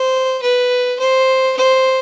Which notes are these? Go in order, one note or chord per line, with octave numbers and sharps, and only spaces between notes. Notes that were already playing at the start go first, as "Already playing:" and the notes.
Already playing: C5
B4
C5
C5